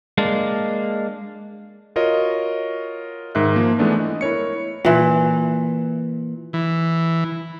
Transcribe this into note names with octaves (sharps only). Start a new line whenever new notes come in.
G#3 A#3 D4
F4 F#4 A#4 C#5 D#5
G#2 D#3 A#4 E5 F#6
F3 A#3
E3 G#3 A3 B3 D4
D#5
E4 A#4 C#5 C#7
A#2 E3
E3